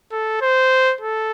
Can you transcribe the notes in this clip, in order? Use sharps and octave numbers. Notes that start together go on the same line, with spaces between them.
A4
C5
A4